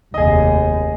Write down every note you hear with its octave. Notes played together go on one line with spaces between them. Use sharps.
F1 D#2 G#4 D#5